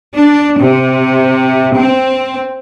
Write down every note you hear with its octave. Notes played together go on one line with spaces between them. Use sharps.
D4
C3
C4